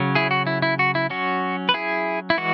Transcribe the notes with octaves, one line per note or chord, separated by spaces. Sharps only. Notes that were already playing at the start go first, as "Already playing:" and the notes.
Already playing: C#3 F#3 C#4
E4 G#4
F#4
E4
E4
F#4
E4
F#3 C#4 F#4
B4
E4 G#4
E4
E3 G#3 F#4